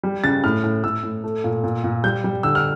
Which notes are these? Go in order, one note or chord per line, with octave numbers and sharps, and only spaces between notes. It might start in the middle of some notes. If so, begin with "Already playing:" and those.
G3
C#3 A6
A2 F6
A2
A2 E6
A2
A3
A#2
A#2
A#2
G3 G6
G3
D3 E6
F6